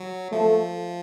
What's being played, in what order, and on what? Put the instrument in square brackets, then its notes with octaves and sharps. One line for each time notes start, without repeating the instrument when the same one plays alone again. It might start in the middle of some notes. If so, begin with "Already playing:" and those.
Already playing: [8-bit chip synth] F#3
[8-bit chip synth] F3 [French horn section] A3